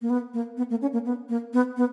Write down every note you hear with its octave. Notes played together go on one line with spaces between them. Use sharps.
A#3
B3
A#3
B3
A#3
C#4
A#3
B3
A#3
B3
B3